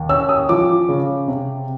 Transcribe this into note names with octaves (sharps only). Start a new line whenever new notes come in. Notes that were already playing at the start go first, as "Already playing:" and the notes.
Already playing: D#2
C#4 E6
D#6
F3 D6
C#3
C3